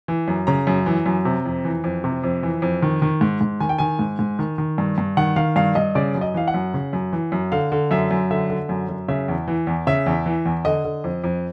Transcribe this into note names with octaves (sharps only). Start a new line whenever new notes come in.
E3
F#2
C#3 A#5
F#2
E3
F#2
C3
F2
E3
F2
C3
F2
E3
F2
D#3
D#3
G#2
G#2
D#3 G#5
G5
D#3 G#5
G#2
G#2
D#3
D#3
G2
G2
D#3 F#5
D#3 F5
G2 F5
G2 D#5
C#3 D5
F#2
D#5
E3 F5
F#5
F#2
C#3
F#2
E3
F#2
D3 F5
D3
F#2 E5
F#2
D3 E5
D3
F#2
F#2
C#3 E5
E2
E3
E2
C#3 E5
E2
E3
E2
D3 D#5
D3
F2
F2